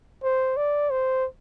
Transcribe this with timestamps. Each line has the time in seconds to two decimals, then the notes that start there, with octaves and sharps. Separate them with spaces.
0.23 C5
0.57 D5
0.90 C5